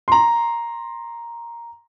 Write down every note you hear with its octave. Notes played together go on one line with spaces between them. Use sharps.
A#5 C6